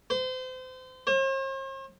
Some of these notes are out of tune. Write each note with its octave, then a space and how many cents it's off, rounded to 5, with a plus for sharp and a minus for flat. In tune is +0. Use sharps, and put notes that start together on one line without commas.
C5 -35
C5 +45